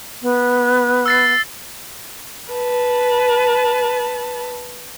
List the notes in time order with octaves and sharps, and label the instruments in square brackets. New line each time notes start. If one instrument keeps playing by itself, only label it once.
[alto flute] B3
[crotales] E6 A6 C7
[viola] B4 A5